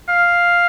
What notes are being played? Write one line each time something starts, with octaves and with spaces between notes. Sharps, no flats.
F5